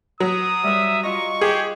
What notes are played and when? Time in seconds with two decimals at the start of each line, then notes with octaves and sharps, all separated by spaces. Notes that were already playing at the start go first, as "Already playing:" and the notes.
0.20 F#3 B4 D#6
0.63 G3 B4 E5
1.03 F4 D#5 A#5 C#6
1.41 G4 G#4 B4